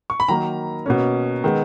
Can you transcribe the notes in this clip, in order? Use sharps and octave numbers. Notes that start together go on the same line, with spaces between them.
C#6
B5
D#3 F#3 A#3 A#5
B2 A#3 C#4
D#3 G#3 B3